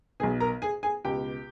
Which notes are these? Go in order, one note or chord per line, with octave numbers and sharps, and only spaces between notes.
B1 B2 G#4 G#5
A#4 A#5
G#4 G#5
G#4 G#5
C#2 B2 G4 G5